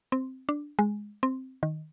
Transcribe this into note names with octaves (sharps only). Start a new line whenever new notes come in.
C4
D4
G#3
C4
D#3